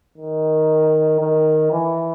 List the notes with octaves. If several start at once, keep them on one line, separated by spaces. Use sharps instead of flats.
D#3
D#3
E3